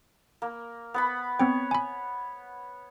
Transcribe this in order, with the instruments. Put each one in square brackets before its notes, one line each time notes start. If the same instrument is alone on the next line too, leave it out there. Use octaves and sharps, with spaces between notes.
[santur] A#3
B3 F#5 B5
[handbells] B3 C4 G5 [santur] C#5
[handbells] G#5 B5